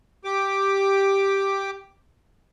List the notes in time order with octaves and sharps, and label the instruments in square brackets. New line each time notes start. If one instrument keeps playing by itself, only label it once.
[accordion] G4 D6